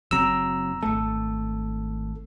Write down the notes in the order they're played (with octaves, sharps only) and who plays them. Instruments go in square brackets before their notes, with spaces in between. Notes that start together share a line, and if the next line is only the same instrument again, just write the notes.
[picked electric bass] F#1 F#3 C4 [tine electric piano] A#5 E6
[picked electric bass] G#1 A3 [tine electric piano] A4